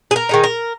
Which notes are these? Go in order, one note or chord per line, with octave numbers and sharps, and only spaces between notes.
G#4
A#4
D#3 G#3 D#4
A#4